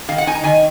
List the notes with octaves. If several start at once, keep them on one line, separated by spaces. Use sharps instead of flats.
D#3 F5
F#5
D#4 G#5
A#5
D#3 G#5